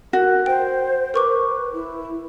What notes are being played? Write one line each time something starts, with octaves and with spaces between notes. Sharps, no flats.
F#4 A#4
C5 G5
A#4 B4 C#6 D6
E4